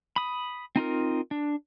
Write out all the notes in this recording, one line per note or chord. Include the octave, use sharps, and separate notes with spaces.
B5 D#6
C4 D#4 F4 A#4
D4